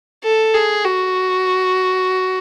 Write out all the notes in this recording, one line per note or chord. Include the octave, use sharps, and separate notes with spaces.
A4
G#4
F#4